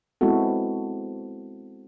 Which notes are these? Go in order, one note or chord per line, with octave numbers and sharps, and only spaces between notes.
G#3 B3 C4 E4 F#4 A4